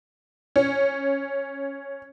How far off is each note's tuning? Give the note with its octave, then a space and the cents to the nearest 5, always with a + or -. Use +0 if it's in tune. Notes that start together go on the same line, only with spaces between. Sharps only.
C#4 -5